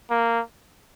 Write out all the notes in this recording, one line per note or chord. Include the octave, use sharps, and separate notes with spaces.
A#3